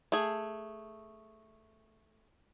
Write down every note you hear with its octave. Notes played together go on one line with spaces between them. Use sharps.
A3 G#4